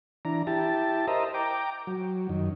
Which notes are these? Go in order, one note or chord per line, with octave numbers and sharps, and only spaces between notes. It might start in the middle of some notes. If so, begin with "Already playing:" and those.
E3 D4 A#5
E4 G4 A5
A#4 C5 D#5 E5 A#5
G5 A#5 D6
F#3
F#2 D#3